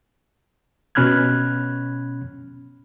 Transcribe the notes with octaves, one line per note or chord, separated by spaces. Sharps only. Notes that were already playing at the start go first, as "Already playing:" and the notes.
B2 C#4 B5 F6 F#6 G#6